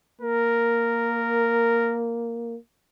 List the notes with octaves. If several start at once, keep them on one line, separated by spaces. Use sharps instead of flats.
A#3 A#4